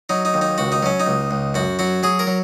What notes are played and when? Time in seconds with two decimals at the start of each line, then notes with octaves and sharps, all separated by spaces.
0.09 F#3 D#4
0.25 D#4
0.34 D#2
0.41 D#4
0.58 C#2 F#4
0.72 D#4
0.83 F#3 C#4
1.00 D#4
1.06 C#2
1.31 C#2
1.54 F#2 F#4
1.79 F#3 F#4
2.03 F#3 G#4
2.19 A#4
2.27 F#3